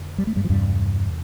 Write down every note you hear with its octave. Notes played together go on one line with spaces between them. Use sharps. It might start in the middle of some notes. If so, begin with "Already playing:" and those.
Already playing: F2 D3
G3
A3
G2 G3
F3
E2 G2 C3 G3